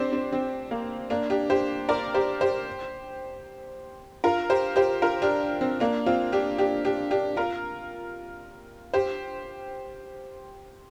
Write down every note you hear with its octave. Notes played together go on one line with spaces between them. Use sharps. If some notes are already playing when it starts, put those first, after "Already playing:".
Already playing: C4 D4 G4 C5 D5
C4
C4
A#3
A#3 D4
D4 G4
G4 C5
A#4 D5
G4 C5
G4 C5
F4 A#4
G4 C5
G4 C5
F4 A#4
D4 G4
C4
A#3 D4
C4 F4
D4 G4
D4 G4
D4 G4
D4 G4
F4 A#4
G4 C5